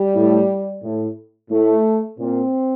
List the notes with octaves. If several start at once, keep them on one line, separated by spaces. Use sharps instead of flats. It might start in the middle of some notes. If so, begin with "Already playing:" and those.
Already playing: G3
A2
A2
A2 A3
A#2 C4